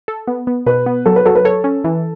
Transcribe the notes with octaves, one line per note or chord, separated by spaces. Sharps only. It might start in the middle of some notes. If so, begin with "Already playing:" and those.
A4
B3
B3
B2 B4
B3
F#3 A4
B4
F#3 A4
B4
A4 C#5
C#4
E3